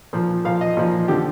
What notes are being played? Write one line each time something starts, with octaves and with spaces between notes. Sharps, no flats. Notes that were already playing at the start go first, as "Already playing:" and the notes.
A#2 F3
A#2 F3 F5
D#5
A#2 F3
D3 F3 G4